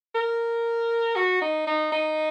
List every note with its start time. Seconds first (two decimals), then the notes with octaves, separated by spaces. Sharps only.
0.15 A#4
1.16 F#4
1.42 D#4
1.67 D#4
1.92 D#4